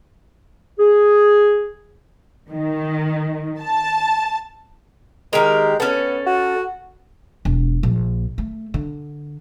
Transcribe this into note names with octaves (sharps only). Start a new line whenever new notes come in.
G#4
D#3
A5
D#3 G#3 G4 A#4
B3 C#4 A4
F#4
E1
A#1
A3
D3